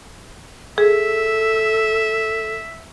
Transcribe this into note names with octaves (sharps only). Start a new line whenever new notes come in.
G#4 A4 E5